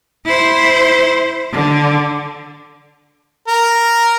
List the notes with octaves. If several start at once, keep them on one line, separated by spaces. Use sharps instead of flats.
E4 C5
D3
A#4